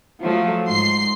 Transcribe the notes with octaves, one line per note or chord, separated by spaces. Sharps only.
F3 F#3 A3
G#2 C6 C7